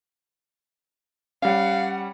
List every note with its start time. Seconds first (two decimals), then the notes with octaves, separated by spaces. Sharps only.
1.42 G3 C#4 F5 F#5